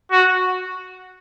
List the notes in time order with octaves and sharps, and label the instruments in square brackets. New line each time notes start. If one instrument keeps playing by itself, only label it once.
[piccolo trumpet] F#4